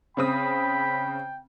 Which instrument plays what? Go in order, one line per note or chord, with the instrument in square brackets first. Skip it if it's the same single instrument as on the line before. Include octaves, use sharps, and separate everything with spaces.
[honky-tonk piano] C#3 C4 D#6 [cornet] G5 [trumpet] B5